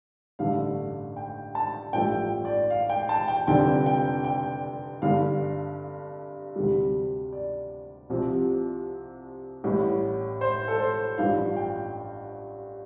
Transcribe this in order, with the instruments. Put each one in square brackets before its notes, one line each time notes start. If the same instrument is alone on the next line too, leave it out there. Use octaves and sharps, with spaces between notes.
[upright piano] A1 G2 D3 A3 F5
G5
A5
A1 G2 F3 A3 G5
D5
F5
G5
A5
G5
F1 F2 D3 G3 G5
G5
G5
G1 G2 D3 F5
D2 C3 G3
D5
C2 C3 F3
A1 A2 G3
C5
A4
C5
A1 G2 F3 F5
G5